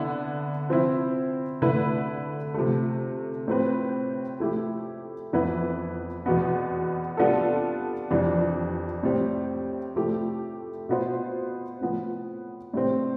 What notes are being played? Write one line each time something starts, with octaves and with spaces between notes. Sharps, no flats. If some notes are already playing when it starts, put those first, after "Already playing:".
Already playing: D3 B3 E4
F3 C4 E4
D3 A3 E4 B4
C3 F3 A3
A2 F3 C4 G4 B4
F3 A3 E4 G4
F2 E3 B3 E4 B4
E2 B2 B3
G3 B3 D4 F4 A4
F2 E3 G3 D4
A2 G3 C4
F3 A3 E4 G4
B2 B3 F4 C5
A2 F3 B3
A2 G3 C4